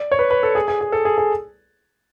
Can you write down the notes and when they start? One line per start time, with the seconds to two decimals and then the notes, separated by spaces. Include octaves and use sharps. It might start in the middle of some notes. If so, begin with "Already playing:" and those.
Already playing: D5
0.12 C#5
0.19 B4
0.31 B4
0.43 A4
0.55 G#4
0.68 G#4
0.81 G#4
0.92 A4
1.05 G#4
1.18 G#4